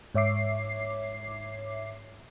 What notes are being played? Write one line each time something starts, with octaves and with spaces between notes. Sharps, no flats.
G#2 C#5 E5 D6 C7